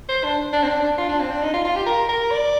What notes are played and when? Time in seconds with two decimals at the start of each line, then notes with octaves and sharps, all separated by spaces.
0.09 C5
0.24 D4
0.53 D4
0.63 C4
0.68 D4
0.83 D4
0.98 F4
1.09 D4
1.20 C4
1.31 D4
1.42 D#4
1.54 F4
1.65 F4
1.76 G4
1.86 A#4
2.09 A#4
2.31 D5